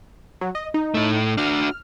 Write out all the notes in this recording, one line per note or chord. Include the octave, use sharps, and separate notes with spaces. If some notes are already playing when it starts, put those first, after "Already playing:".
F#3
D#5
D#4
A2 A3
D4 F#4 F6